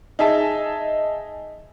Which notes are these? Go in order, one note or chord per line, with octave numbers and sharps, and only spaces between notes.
D#4 G#4 E5 G#5 A5